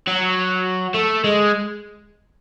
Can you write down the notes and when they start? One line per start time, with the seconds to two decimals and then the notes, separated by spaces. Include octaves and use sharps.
0.07 F#3
0.94 A3
1.24 G#3